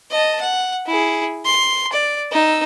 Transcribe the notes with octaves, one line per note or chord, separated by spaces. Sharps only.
D#5 A5
F#5
E4 G#4
C6
D5
D#4 E6